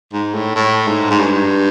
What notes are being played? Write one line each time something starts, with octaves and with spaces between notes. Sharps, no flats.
G#2
A2
A2
G#2
G#2
G2